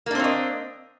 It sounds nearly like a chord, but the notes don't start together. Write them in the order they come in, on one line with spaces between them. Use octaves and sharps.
A#3 D4 C4 C#5 D#5